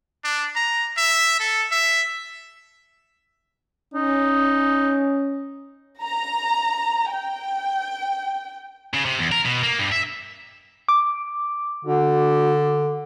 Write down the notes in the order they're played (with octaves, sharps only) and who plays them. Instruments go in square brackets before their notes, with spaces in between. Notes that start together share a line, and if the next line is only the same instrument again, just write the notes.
[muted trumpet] D4
A#5
E5
A4
E5
[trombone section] C#4 [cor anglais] D#4
[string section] A#5
G5
[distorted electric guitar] C#3
C3
E2
A#4
B2
A#3
G2
E5
[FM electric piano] D6
[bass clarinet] D3 [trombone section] D4 F#4